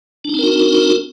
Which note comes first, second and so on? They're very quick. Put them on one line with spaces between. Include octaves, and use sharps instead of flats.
D4 D#4 C4 A#4 F#4